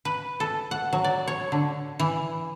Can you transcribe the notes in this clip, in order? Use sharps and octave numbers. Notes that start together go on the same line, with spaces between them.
B4
A4
F#5
F#3
D5
C#5
D3
E3